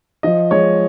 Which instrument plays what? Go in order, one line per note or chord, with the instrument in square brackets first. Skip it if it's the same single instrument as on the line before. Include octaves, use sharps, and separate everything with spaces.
[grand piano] F3 D#5
G#3 C#5